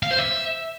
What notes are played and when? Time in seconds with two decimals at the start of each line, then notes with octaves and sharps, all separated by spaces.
0.03 F5
0.11 C5
0.19 E5